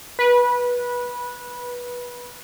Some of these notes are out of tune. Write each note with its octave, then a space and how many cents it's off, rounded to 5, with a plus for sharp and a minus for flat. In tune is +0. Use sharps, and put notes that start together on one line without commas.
B4 -20